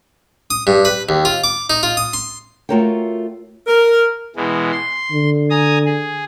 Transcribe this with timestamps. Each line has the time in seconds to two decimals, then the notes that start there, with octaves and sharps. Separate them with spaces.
0.50 D#6
0.67 G2
0.85 B4
1.09 D#2
1.25 F4
1.44 D6
1.70 D#4
1.83 F4
1.97 D#6
2.13 C6
2.69 A3 F4 F#4 A#4 C#5 G5
3.67 A#4
4.36 B2 E3 G#3
4.72 C6
5.11 D3
5.50 G#5 A#5 D#6
5.85 G#4